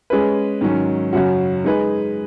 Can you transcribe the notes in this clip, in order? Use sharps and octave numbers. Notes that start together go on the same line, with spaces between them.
G#3 C#4 G#4 B4
G#2 D#3 F#3 C#4
F#2 C#3 F#3 C#4 F#4
G#3 D#4 G#4 B4